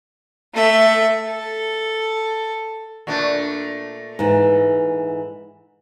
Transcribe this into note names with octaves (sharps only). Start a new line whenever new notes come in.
A3 E5
A4
A#2 A3 D4
G#2 E3